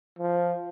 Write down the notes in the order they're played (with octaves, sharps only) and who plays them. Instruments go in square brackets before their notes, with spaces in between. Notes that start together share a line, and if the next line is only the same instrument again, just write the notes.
[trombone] F3